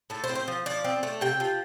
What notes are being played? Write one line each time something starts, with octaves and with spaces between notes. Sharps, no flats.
A2 A4
C5
C4
C5
F3
F3 D5
C4
A3
C3 G5
F3